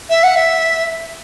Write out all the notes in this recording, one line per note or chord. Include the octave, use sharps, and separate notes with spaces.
E5
F#5
E5